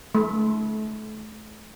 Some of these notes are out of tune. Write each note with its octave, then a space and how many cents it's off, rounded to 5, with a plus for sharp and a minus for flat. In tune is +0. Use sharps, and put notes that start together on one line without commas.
A3 -30